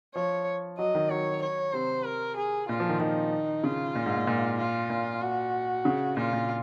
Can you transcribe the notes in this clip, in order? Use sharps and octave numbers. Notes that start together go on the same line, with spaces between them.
F3 C#5
F#3 D#5
D#3
F#3 C#5
C#5
C3 C5
A#4
G#4
A#2 F4
F3
D#3
D#3 D#4
C#3 F4
A#2
G#2
A#2
A#2
F4
A#2
F#4
C#3
A#2 F4
A#2